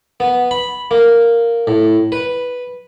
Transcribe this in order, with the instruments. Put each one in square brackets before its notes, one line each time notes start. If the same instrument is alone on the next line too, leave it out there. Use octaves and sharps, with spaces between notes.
[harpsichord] B3
B5
A#3
A2
B4